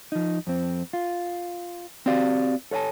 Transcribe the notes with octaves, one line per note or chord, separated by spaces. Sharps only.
F3 D#4
F2 C4
F4
C4 F#4 G4 D5 F5
A4 C#5 F5 G#5 A5